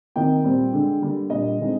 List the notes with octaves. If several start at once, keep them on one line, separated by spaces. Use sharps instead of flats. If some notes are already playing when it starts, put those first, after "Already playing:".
C3 D#3 A#3 D#4 G5
A#2 G3 C4
D3 G#3 D4
D3 G3 A#3
A#2 G3 D4 D#5
D3 G#3 C4 D#4